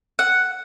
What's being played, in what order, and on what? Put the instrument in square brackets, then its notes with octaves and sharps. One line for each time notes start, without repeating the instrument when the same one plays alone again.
[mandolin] F#5